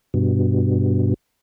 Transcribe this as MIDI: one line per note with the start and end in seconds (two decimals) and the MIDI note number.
0.14 1.14 43
0.14 1.14 47